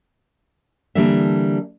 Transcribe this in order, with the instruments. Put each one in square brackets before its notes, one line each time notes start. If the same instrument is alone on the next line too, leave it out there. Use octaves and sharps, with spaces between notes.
[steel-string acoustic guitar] D3 E3 G3 A#3 D4 E5